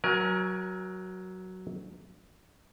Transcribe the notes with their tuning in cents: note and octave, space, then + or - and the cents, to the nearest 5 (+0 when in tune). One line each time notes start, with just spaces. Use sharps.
F#3 +5 A#4 +35 G#5 +0